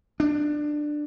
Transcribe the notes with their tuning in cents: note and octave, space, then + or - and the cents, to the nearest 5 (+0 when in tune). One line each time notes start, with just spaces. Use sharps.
D4 +15